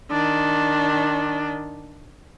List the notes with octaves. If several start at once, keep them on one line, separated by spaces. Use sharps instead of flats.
D#3 D4